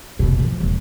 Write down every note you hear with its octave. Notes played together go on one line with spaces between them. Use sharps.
F1 B2
E3 F3
E1